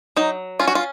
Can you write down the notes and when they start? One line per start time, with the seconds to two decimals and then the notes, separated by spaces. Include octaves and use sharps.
0.16 F#3 D#4
0.59 C#4 F4
0.68 F#4
0.75 F4